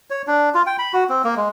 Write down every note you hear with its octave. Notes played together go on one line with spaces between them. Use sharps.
C#5
D4
F4
G5
B5
F#4
C4
A#3
G#3